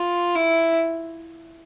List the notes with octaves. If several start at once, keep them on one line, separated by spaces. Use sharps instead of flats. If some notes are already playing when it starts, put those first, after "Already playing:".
Already playing: F4
E4